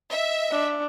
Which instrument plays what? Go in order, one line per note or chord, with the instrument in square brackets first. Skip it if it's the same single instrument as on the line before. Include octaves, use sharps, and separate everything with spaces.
[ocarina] D#5 [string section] E5
[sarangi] D4